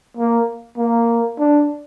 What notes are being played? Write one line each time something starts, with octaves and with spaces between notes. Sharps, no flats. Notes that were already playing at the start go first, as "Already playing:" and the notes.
A#3
A#3
D4